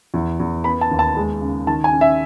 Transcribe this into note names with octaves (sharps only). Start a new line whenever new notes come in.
E2
E2
B3 B5
A5
D#2
A5
G#3
C#3
D#3 A5
G#5
C#4
E5